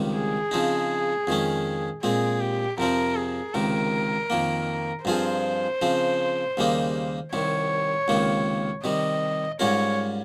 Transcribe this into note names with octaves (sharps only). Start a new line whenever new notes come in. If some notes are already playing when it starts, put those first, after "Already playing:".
Already playing: C#2 C3 D#3 G3
G#4
C#3 F3 C4 D#4
F2 D#3 G#3 C#4
A#2 G#3 C4 G#4
G4
F2 C3 F3 C4 A#4
G#4
C#2 C3 D#3 A#4
F2 D#3 A#3
G2 F3 C4 F4 G#4 C5
C#3 F3 C4
D#2 C#3 G3 A#3 D#4
C2 C3 D#3 C#5
C#2 C3 D#3 A#3
C3 D#3 G3 D#5
G#2 G3 C#4 F4 A#4 C#5